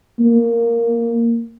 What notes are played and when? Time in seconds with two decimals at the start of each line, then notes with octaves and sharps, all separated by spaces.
0.20 A#3